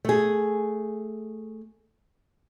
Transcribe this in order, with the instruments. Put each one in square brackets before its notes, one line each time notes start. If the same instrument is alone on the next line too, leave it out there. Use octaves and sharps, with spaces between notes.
[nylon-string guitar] A3 G#4